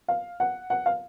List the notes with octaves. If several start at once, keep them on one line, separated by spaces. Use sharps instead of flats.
F5
F#5
F#5
F5